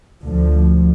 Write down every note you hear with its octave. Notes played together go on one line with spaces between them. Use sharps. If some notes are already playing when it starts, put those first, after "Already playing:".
D2 D3 F3